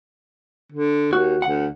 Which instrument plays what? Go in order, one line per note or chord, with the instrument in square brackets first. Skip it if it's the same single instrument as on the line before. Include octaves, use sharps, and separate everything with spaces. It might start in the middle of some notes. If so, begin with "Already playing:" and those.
[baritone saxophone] D3
[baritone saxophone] D#2 [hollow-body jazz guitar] F#4
[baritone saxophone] D2 [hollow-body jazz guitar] F#5